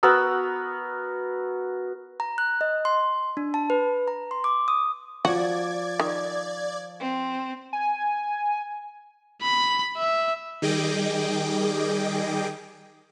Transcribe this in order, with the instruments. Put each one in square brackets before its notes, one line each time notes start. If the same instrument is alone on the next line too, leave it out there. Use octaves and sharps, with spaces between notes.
[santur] B3 F#4 A#4 E6
[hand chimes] A#5
F#6
D#5
C6
D4
A5
B4
A#5
C6
D6
D#6
[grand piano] F3 [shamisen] F#4 [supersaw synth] D5 G#6
[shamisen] D#3
[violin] C4
[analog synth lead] G#5
[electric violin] B5
E5
[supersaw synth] D#3 G3 G#4 D#5 G5 D6